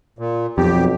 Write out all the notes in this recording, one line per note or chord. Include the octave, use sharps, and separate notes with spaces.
A#2
B1 F2 G4